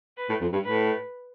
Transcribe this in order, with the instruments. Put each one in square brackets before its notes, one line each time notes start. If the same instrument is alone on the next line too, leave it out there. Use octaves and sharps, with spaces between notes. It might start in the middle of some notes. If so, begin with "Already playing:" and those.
[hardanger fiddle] B4
[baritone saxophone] A2
F2
G2
[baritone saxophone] A2 [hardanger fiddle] B4